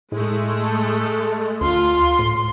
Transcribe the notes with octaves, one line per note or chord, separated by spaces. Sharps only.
A2 G#3 A3
A4
D2 F4 C6
A2